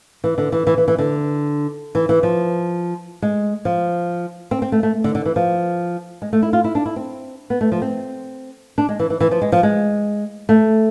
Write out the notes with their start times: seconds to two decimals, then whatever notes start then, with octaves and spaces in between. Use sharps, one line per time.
0.24 E3
0.38 D3
0.52 E3
0.67 E3
0.78 E3
0.88 E3
0.98 D3
1.95 E3
2.09 E3
2.23 F3
3.22 G#3
3.65 F3
4.51 C4
4.62 C4
4.72 A3
4.83 A3
5.04 D3
5.15 D3
5.25 E3
5.36 F3
6.22 G#3
6.33 A3
6.42 E4
6.53 F4
6.64 E4
6.75 D4
6.85 E4
6.96 C4
7.50 B3
7.61 A3
7.72 F3
7.82 C4
8.78 D4
8.89 G#3
8.99 E3
9.10 E3
9.20 E3
9.31 F3
9.42 G#3
9.52 F3
9.63 G#3
10.49 A3